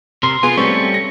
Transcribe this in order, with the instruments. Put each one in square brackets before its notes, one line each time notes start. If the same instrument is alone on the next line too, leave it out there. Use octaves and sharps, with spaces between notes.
[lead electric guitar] C3 A#4 [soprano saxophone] C6
[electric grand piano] B3 [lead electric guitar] F4 [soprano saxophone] G#4
[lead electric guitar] G3 C#4 [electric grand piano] A3 C4 [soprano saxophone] C#6
[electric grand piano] A#6